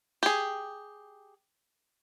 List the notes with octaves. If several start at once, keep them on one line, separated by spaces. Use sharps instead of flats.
G4 G#4